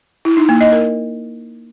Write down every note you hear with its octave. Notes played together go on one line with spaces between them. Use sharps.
E4
D#4
A#3
D#5
A#4